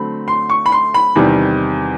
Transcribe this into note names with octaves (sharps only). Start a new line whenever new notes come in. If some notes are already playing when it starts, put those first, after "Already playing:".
Already playing: D3 F#3 A3 C4 B5
C6
C#6
B5
C6
B5
E2 C3 D#3 G3